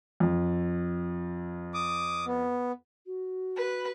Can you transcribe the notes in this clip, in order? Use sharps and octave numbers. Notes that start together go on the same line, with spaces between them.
F2
D6 D#6
B3
F#4
B4